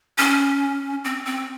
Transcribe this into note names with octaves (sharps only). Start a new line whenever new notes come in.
C#4
C4
C4